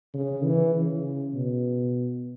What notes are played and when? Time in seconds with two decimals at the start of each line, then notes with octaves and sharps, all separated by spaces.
0.14 C#3
0.44 E3
0.75 C#3
1.35 B2